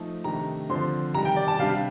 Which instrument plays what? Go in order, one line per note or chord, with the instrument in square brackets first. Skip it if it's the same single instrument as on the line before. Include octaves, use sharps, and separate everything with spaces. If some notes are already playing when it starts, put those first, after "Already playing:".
Already playing: [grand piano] F3 A3 D#4
C3 D#3 A3 D4 A#5
D3 F3 C4 C6
C3 D#3 G3 A#5
G5
D5
A5
C3 G3 D4 F5